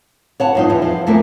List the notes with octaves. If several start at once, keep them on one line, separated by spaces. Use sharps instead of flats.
C#5 F#5 A5
G2 F3 D#4
E2
F3
E2 A3 A#3 E4